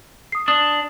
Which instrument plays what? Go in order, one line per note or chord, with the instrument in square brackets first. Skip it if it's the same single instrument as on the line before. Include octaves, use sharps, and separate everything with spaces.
[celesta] D#6 C7
[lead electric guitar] D4 [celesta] D#6